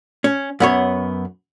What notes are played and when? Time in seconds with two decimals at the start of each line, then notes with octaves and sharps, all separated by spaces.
0.24 C#4
0.60 F#2 B3 C#5